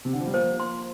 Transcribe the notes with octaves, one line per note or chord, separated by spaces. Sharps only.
C3
D3
F3
G3
F3 A#3 C5
C6